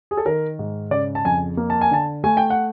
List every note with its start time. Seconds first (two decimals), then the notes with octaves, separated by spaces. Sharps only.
0.11 G#4
0.17 A4
0.25 D#3 A#4
0.59 G#2
0.91 C#3 D5
1.15 A5
1.25 F2 G#5
1.57 A#3
1.70 A5
1.81 G#5
1.91 D3 A5
2.24 A3 G#5
2.37 G5
2.50 F#5